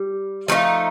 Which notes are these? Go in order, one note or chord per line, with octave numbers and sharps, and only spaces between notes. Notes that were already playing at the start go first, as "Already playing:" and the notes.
Already playing: G3
F3 A3 D#4